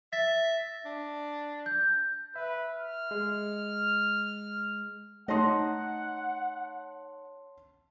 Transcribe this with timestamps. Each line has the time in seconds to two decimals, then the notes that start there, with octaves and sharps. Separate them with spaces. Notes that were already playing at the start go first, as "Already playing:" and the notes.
0.13 E5 A6 A#6
0.85 D4
1.66 G6
2.36 B4 E5
2.73 F6
3.11 G#3
5.28 A3 D#4 C#5 D#5 F#5 A5 C6